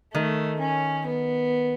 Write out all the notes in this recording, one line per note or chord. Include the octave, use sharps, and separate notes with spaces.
D#3 A3
C#4
B3